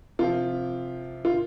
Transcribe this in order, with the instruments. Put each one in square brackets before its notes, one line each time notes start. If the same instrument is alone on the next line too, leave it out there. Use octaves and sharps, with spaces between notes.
[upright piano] C3 F3 F4
F4